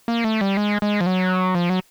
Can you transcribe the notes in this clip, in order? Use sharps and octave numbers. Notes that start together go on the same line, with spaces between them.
A#3
A3
G3
G#3
G#3
F3
F#3
F3
F#3